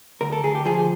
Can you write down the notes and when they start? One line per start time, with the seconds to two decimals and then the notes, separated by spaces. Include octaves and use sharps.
0.21 D2 A#4
0.32 A4
0.44 D2 G#4
0.55 G4
0.65 F3 G#4